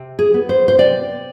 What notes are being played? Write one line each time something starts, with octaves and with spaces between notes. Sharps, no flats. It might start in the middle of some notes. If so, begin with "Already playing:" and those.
Already playing: C3
G#4
B3
C5
C5
C3 D5